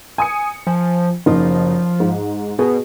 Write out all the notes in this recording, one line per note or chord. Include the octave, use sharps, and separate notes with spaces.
G#5 D#6 C#7
F3 G#5
F#1 F3 D#4
G#2
B2 G#4